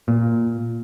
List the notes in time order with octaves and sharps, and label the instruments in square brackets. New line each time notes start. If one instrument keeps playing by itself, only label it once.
[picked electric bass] A#2